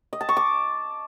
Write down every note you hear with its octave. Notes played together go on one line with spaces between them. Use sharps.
D#5
A5
C#6
D6